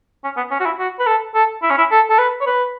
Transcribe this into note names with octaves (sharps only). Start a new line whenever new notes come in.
C#4
B3
C#4
F#4
E4
F#4
B4
A4
A4
E4
C#4
E4
A4
A4
B4
C#5
B4